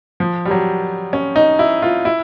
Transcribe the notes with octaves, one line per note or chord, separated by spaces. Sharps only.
F3
G3
F#3
C#4
D#4
E4
F4
E4